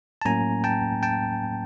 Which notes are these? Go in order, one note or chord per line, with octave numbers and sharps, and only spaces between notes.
A5
A2 F#3 A#3 C#4 G#5 A#5
G5 A5
G5 A5